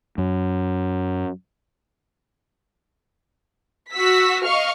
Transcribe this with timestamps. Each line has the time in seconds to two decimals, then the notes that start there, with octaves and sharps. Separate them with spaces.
0.18 F#2
3.92 F#4 E6 B6
4.43 D#5 F5 C#6 F6